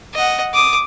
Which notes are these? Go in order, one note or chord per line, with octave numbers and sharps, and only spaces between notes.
D#5 F#5
D6 D#6